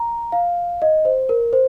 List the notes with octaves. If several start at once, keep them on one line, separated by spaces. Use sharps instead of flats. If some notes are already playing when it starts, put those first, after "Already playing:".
Already playing: A#5
F5
D#5
C5
A#4
C5